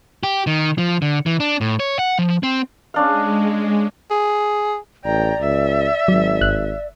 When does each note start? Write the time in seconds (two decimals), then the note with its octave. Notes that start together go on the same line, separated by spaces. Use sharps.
0.23 G4
0.47 D#3
0.78 F3
1.02 D3
1.26 E3
1.40 D4
1.61 A2
1.80 C#5
1.99 F#5
2.19 F3
2.43 C4
2.94 G#3 C#4 D4 F5
4.11 G#4
5.04 A1 D5 G5 A#5
5.40 C#2 E5
6.08 G#1 F#3
6.41 G1 F#6